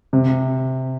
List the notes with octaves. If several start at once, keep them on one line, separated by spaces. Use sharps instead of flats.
C3